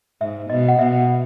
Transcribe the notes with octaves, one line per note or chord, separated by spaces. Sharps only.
G#2 E5
B2 D#5
F#5
B2 E5